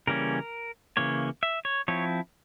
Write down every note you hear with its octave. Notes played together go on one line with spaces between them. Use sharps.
C#3 E3 G3 A#3 C#4 A#4
C#3 E3 A#3 C#5
E5
C#5
F3 C4 E4 C#5